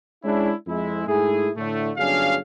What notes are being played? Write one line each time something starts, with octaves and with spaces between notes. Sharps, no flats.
G#3 C#4 D4 E4
F2 G#3 E4
G#2 A3 E4 G#4
A2 D3 A3
G1 F#3 C#4 D4 G#4 F5